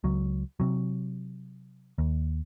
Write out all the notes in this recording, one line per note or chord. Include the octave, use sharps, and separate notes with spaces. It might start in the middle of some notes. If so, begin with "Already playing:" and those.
C#2 F#3
C3 F#3
D#2